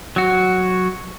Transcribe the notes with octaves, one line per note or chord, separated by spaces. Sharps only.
F#3 F#4